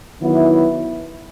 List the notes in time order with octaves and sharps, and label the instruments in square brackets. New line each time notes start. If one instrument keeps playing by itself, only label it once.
[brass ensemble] D#3 F#3 B3 E4